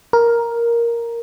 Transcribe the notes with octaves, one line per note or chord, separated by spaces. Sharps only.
A#4